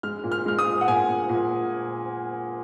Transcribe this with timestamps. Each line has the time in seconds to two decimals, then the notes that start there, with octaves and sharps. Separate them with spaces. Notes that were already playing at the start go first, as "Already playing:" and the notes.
0.03 G#3 F6
0.24 A#2
0.32 F6
0.46 G#3 F6
0.59 D#6
0.66 A#2
0.81 F#5
0.88 A#2 G#5
1.08 A#2
1.29 A#2